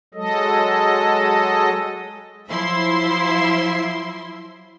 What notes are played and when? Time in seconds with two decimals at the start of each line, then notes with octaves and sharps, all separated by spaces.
0.14 F#3 G#3 A4 D#5
2.48 F3 F#3 E4 E5 C6